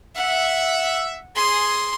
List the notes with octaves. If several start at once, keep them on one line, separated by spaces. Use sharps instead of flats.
E5 F#5
G#4 C6